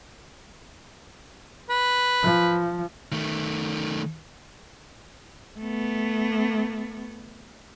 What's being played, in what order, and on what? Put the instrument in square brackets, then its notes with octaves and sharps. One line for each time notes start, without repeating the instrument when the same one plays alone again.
[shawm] B4
[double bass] F3
[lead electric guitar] D#3 A3
[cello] A3 B3